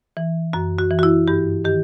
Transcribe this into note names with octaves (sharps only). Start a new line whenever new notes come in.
E3
F#2 F#4
F#4
E3
F#4
E4
G2 G4
D#3 G4